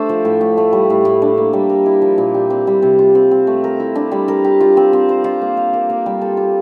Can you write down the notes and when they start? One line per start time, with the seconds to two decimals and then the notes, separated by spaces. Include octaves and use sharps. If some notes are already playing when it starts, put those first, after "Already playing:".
Already playing: A3 D4 A4 C5
0.09 F3
0.25 A2
0.41 A2
0.57 A3
0.73 G3
0.90 A2
1.05 A2
1.22 D4
1.37 A#3
1.53 G3
1.69 A#4
1.86 E4
2.02 F3
2.18 A#2
2.34 G4
2.50 C4
2.67 G3
2.82 C3
2.99 F4
3.15 C4
3.31 C4
3.47 A3
3.64 A#4
3.80 E4
3.95 D4
4.11 G3
4.28 A#4
4.44 G4
4.60 F4
4.77 C4
4.93 C4
5.09 C5
5.24 F4
5.41 A#3
5.57 F5
5.73 A#4
5.90 A#3
6.06 G3
6.21 A4
6.37 F4